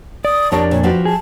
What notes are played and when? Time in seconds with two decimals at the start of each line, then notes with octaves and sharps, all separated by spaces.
0.25 D5 D#6
0.52 F2 D4 G4 A#4 C#5 D5 A5
0.71 A#2 C#5
0.83 F3 F#4 G4 B4
1.05 G#4 A5